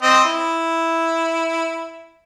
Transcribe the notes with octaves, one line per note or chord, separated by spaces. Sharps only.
C4 D#5
E4